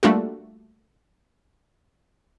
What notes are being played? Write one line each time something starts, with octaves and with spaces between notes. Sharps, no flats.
G3 A3 A#3 D4 F4 F#4